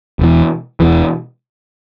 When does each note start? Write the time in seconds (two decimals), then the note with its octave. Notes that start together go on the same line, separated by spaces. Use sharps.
0.19 E1 E2 E3
0.80 E1 E2 E3